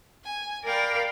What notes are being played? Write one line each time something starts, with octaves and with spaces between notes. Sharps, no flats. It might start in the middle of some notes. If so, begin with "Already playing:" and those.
G#5
A#4 D5 F5 G5 B5